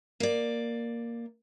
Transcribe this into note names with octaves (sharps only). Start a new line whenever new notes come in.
A#3 D5